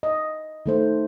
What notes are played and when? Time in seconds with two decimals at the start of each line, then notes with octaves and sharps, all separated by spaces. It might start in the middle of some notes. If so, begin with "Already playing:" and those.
0.03 D#5
0.66 D#3 A3 C5